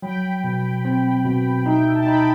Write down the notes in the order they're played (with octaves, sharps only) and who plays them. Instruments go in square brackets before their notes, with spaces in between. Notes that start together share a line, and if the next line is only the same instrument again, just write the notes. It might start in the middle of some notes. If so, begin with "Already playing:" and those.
[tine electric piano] F#3 [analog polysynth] G5 B5
[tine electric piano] B2
C4
B2
[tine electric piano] D#4 [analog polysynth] E5 G5
[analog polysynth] A5
[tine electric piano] D#4 [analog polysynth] G5 B5